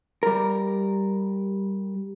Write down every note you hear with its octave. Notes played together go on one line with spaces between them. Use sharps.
G3 A#4